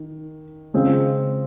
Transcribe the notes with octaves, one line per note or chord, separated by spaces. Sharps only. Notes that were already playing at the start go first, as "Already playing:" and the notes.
Already playing: D#3
C#3 G#3 C4 F4